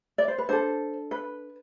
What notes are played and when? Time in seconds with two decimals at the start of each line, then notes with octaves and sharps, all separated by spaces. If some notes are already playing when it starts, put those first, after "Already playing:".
0.18 D5
0.28 C5
0.38 B4
0.49 D4 A4 C5
1.11 B4